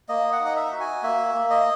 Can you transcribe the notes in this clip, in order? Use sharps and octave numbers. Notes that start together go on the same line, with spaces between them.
A#3 D#5
F#5
D#4
D#5
E5
F#4
G#5
A#3 E5
A#3
D#5